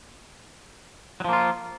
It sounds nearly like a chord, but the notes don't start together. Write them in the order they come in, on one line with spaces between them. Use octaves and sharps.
F#3 F3 A#3 F4